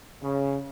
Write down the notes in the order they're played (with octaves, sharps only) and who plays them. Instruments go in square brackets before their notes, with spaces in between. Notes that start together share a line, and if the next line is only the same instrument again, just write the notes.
[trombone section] C#3